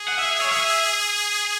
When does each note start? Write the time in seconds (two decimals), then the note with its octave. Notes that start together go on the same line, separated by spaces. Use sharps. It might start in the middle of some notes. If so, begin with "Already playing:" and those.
Already playing: G#4
0.08 F#5
0.19 E5
0.41 C#5
0.51 E5